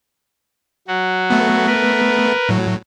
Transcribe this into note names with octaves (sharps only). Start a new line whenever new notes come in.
F#3 F#4
A3 B3
A#4 B4
A2 F#3